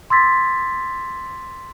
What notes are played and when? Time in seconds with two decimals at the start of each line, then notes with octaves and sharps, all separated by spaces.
0.10 C6 D6 E6 G#6 A6 B6